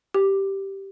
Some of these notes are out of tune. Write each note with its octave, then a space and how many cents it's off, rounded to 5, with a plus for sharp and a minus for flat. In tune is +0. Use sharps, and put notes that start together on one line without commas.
G4 -5